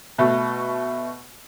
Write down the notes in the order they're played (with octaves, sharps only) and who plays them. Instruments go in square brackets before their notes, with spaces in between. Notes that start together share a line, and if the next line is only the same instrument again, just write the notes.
[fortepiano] B2 A3